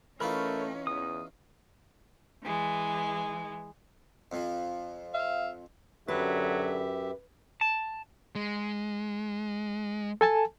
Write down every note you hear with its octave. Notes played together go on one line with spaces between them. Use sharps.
E3 A3 C#4 D#4 F4 A#4 B5
E2 D#6
E3 G#3
F2 F3
E5 F5
F#2 D3 F#3 G4 B4 E5
A5
G#3
A4 G#5 A5